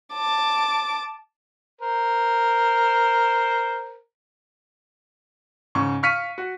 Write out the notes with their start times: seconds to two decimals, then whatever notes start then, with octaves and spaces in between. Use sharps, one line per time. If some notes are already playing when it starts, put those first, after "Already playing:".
0.14 A5 D6
1.81 A#4 C5
5.75 G#2 C#3 C#6
6.03 F5 C#6 F6 B6 C#7 D#7
6.38 F#4